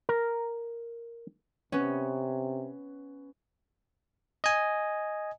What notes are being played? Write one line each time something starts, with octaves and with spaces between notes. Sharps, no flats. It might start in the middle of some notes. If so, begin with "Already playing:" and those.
A#4
C3 B3 C#4
D#5 G#5